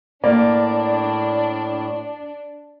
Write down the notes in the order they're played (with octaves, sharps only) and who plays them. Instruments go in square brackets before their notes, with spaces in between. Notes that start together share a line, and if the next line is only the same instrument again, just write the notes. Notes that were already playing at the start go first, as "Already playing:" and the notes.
[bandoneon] A2 [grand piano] A#3 [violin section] D4 [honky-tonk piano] D5